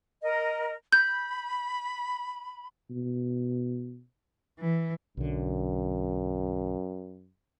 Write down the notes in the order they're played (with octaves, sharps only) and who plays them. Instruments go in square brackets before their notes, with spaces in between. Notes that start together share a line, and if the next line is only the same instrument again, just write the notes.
[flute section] A#4 D#5
[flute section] B5 [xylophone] G6
[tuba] B2
[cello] E3
[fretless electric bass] B1 D3 [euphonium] F#2